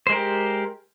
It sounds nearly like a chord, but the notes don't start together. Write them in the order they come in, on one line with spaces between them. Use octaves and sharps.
C5 G#3 A#4 G4